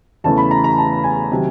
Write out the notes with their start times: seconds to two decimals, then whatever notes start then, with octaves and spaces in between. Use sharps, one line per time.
0.24 E2 C#3 E3 A3 A5
0.38 B5
0.51 A#5
0.64 A#5
0.78 A5
1.04 G#5
1.32 C3 D#3 F#3